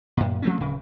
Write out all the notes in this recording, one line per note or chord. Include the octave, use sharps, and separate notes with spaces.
F#2 A#2
F3 A3 C4 C#4
D1 C#3